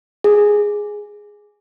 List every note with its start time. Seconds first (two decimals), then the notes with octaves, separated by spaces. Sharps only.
0.24 G#4